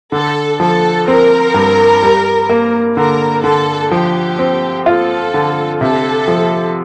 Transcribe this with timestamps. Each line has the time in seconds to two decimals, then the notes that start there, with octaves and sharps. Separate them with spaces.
0.12 D3 A4
0.60 F3 A4
1.07 C4 A#4
1.54 G2
2.02 G3
2.49 A#3
2.96 D3 A#4
3.44 D3 A4
3.91 F3 G4
4.39 C4
4.86 F4 A4
5.34 D3
5.81 C3 A4
6.28 F3